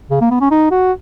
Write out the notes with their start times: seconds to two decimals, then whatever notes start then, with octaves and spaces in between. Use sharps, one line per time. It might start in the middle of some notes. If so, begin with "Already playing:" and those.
0.10 C#3
0.21 A#3
0.31 B3
0.41 C#4
0.51 D#4
0.71 F#4